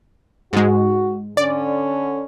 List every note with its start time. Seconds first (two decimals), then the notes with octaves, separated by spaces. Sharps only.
0.53 G#2 G#3 F#4
1.37 D3 C#4 D5